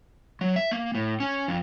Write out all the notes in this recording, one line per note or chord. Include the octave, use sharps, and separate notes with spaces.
F#3
E5
A#3
A2
C#4
F2